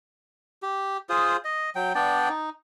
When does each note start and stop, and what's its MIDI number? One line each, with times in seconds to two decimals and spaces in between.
0.63 0.97 67
1.09 1.37 65
1.09 1.37 68
1.09 1.37 72
1.09 1.37 87
1.45 1.70 75
1.75 1.93 54
1.75 1.93 79
1.95 2.29 59
1.95 2.29 62
1.95 2.29 74
1.95 2.29 79
2.29 2.50 63